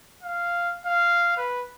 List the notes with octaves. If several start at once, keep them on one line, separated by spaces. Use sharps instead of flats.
F5
F5
B4